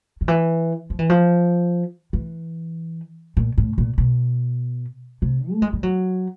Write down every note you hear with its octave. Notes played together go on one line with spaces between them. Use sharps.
D#3
E3
F3
E3
F3
E3
A#2
A2
A#2
B2
C3
A3
G#3
G3
F#3